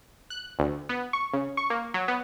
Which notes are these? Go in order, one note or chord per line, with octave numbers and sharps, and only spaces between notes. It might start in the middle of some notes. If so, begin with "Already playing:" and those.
F#6
D2
B3
C#6
C#3
C#6
A#3
F#3
B3